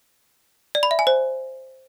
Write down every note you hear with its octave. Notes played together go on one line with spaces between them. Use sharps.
D5
B5
E5
G#5
C5